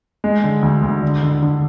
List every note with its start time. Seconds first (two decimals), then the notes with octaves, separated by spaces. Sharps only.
0.24 G#3
0.44 D3
0.63 D2
0.83 D2
1.03 D3
1.23 D3
1.43 D3